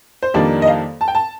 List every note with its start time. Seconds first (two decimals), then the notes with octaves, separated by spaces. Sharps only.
0.23 C5
0.34 F2 D#3 G3 A#3 D4 D5
0.62 D#5
0.68 F5
1.01 A5
1.08 G5
1.15 A5